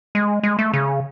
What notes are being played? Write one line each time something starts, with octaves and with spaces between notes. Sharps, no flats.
G#3
G#3
A3
C#3